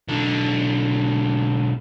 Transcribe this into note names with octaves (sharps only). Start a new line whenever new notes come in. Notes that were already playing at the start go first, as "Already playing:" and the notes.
B1 D3